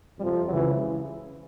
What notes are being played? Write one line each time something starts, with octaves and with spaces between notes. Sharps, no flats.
F2 C3 F3 G3
C#2 C#3 E3 F#3